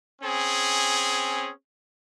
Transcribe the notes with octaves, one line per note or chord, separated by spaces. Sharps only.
C4 C#4 G#4